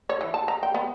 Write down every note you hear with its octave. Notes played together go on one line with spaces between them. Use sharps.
C#5
E3
A5
A#5
G5
B3